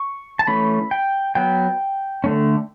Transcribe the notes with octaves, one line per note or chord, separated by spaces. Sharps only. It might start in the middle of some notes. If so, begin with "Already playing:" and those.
Already playing: C#6
A5
E3 A3 C#4 B5
G5
F#3 B3 G5
D3 A3 C#4